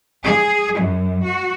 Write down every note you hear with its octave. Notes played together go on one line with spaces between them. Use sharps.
G#4
F#2
F#4